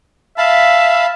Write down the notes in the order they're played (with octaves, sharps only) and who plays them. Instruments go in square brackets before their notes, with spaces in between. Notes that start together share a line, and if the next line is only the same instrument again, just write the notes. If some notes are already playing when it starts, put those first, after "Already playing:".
[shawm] E5 [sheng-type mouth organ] F5 A5 B5